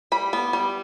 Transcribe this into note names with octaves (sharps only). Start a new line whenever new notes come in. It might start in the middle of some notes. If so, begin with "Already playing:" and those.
G3 B5
B3
G3